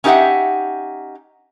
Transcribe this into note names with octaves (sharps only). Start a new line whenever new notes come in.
C#4 D#4 G4 A#4 E5 F#5